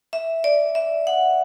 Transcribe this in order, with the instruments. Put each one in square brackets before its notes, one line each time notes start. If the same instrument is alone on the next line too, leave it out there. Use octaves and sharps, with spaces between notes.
[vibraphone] E5
D5
E5
F#5